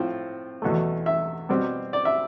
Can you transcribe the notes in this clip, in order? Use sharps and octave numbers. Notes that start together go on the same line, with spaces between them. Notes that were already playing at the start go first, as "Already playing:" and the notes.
Already playing: A2 F3 C4 F4
E2 B2 A3
E5
B2 G3 C4
D5
E5